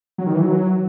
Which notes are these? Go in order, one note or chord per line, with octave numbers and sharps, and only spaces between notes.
F#3
D#3
E3
F#3